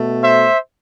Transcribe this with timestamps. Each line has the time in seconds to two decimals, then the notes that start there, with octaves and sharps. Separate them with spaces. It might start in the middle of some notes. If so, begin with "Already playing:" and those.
Already playing: B2 A3
0.23 C5 E5